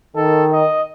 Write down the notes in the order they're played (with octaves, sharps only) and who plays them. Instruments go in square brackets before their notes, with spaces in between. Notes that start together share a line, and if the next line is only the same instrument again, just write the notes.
[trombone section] D#3 [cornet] A4
[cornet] D#5